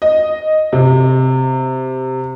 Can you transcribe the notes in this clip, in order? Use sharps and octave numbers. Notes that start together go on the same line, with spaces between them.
D#5
C3